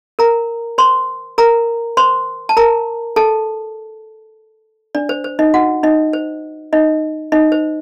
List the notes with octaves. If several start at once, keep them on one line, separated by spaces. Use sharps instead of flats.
A#4 A#5
C5 C6
A#4 A#5
C5 C6
A5
A#4 A#5
A4 A5
D4 D5
C5
C5
D#4 D#5
F#4 F#5
D#4 D#5
C5
D#4 D#5
D#4 D#5
C5